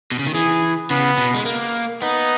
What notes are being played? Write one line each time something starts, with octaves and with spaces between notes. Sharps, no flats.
B2
C#3
D#3
E3 G#4
C#3 B3
B2
G#3
A#3
B3 D#4